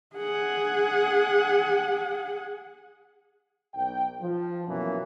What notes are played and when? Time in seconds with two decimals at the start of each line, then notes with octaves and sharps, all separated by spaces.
0.16 G#4 F#5
3.74 B1 G5
4.21 F3
4.67 F#2 B2 E3 A#3 B3 C#4